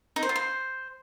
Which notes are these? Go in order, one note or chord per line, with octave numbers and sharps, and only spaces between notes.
D#4
C5
F4
C5